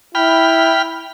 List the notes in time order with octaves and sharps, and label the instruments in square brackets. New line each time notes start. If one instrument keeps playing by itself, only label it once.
[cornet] E4 [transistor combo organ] G5 B5 F6